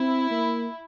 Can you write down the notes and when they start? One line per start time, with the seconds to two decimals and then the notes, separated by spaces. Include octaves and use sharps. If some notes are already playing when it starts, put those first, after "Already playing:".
Already playing: C4 E4
0.31 A#3